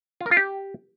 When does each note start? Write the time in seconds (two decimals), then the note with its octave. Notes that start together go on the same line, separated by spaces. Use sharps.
0.21 F4
0.26 A#4
0.31 F4
0.37 G4